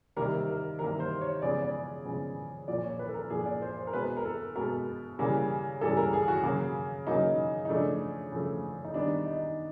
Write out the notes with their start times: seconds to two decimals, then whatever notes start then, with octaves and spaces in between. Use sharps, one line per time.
0.16 C3 D#3 G3 A#3 A#4
0.48 A#4
0.79 C3 D#3 G3 A#3 A#4
1.00 C5
1.21 C#5
1.42 C#3 F3 G#3 B3 D5
1.62 D5
2.05 C#3 F3 G#3 B3
2.68 A#2 F3 A#3 D5
2.84 C#5
2.99 B4
3.09 A4
3.14 A#4
3.30 A#2 F3 A#3 G#4
3.46 D5
3.62 C5
3.77 C5
3.87 A#4
3.93 B2 G#3 B3 B4
4.17 A#4
4.25 A4
4.55 B2 G#3 B3 A#4
5.19 C#3 E3 G3 A#3
5.81 C#3 E3 G3 A#3 A4
5.97 A#4
6.13 G#4
6.28 F#4
6.43 C#3 F#3 A#3
7.07 C#3 F#3 A#3 D#4
7.65 D#4
7.69 C#3 F3 A3 D4
8.32 C#3 F3 A3
8.84 D#4
8.94 D#3 G3 B3 D4
9.26 D#4